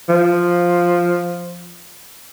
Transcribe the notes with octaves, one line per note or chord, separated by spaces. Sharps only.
F3